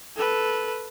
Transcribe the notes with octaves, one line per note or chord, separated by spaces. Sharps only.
A4 B4